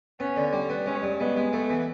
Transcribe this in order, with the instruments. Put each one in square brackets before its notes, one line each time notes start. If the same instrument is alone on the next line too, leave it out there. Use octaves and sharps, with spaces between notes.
[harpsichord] B3 [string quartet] C#4
[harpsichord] D3
G3
B3
[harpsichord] G#3 [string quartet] C#4
[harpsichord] G2
[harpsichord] G#3 [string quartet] B3
[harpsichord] G#3
[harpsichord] A3 [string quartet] B3
[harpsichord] E3